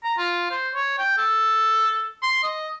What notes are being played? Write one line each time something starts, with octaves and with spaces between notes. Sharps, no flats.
A#5
F4
C5
C#5
G5
A4
C6
D#5